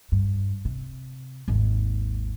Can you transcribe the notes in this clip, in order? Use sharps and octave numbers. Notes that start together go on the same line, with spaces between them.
G2
C3
G#1 D#2